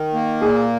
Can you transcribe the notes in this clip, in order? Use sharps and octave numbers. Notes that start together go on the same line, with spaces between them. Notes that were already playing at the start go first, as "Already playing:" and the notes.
Already playing: D#3
A#3
A#2 G#4